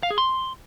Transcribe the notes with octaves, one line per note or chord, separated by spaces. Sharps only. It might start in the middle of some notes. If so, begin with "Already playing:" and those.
F5
G#4
C6